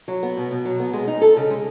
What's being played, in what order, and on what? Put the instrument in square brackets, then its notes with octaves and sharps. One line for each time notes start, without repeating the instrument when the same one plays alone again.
[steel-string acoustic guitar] F#3
B3
B2
B2
F#3
B3
G#3
D#4
A4
C#3
G#3